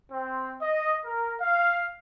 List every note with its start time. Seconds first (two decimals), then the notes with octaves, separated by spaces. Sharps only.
0.12 C4
0.62 D#5
1.06 A#4
1.42 F5